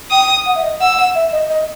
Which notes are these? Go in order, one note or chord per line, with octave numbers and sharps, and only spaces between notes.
G5 D#6
F#5
E5
D#5
F#5 E6
F#5
E5
D#5
D#5